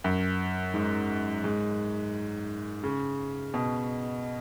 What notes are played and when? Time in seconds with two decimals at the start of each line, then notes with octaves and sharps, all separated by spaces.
0.04 F#2
0.74 G#2
1.44 G#2
2.83 C#3
3.54 B2